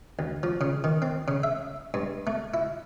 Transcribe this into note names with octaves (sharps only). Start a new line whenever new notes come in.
D2
F3
C#3
D#3
C4
C#3
E5
G2
A3
E4